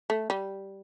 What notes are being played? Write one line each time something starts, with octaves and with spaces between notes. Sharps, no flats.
A3
G3